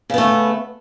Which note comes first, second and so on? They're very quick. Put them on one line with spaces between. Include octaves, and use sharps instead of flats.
C#3 B3 A3